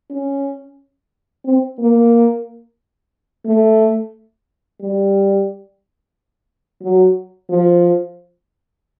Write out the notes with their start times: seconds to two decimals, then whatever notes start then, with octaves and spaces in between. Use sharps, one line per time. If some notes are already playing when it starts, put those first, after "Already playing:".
0.10 C#4
1.45 C4
1.79 A#3
3.46 A3
4.80 G3
6.82 F#3
7.50 F3